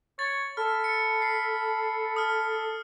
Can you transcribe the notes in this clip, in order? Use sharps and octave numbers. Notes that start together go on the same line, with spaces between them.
C#5 A6
A4 B5 F6
C#7
C7
D#6 F6